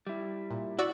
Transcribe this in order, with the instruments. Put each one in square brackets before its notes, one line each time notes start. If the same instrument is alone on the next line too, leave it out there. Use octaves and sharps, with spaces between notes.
[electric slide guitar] G3 E4
[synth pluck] A#2
[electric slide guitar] E4 F#5 [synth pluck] F#4 D5 E6